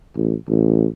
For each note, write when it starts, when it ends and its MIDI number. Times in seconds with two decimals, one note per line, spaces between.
0.16 0.35 33
0.48 0.88 33